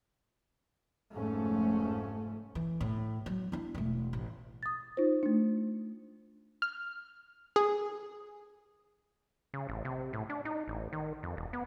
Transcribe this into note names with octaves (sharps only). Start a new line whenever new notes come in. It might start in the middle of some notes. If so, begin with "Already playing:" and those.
F1 G#2 F3 A3 C#4
E3
A2
F#3
D4 E4
E1 A3
A1
D#6 A6
D#4 F4 C5
A3 D4
F6
G#4
C#3
A1
C3
A2
D4
D#4
A1
D#3
F2
E1
B3